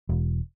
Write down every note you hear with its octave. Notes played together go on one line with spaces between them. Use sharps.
E1